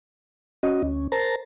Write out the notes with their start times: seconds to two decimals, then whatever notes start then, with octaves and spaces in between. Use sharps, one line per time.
0.63 C#4 F#4 D#5
0.83 D2 C#4
1.12 A#4 C5 A5 A#5